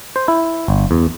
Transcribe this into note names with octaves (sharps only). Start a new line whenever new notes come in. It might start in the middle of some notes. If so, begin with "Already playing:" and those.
C5
E4
G1
E2